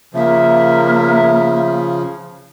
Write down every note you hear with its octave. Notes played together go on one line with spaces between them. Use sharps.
C#3 F3 A#3 E5